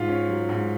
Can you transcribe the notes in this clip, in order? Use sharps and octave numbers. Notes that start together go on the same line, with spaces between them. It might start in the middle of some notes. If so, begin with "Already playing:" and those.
Already playing: G#2 F4
C#4
F#3
G#2